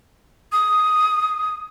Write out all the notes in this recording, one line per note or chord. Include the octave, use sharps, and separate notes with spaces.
D#6